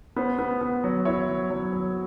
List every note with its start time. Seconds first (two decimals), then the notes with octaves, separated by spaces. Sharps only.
0.17 B3 C5
0.39 B3
0.61 B3
0.84 F#3
1.05 E4 C#5
1.29 F#3
1.50 F#3
1.73 F#3